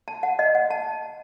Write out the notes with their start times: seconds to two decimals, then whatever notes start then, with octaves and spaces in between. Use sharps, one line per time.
0.08 A5
0.23 F#5
0.39 D#5
0.55 F#5
0.70 A5